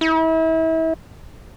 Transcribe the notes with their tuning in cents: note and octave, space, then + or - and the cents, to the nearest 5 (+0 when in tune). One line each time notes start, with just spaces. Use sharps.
E4 -35